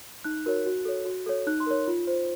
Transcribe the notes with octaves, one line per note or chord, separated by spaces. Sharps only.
D#4 F#6
F#4 A#4 C#5
F#4
A4 C#5
F#4
A4 C#5
D#4 F#6
C6
A#4 C#5
F4
C5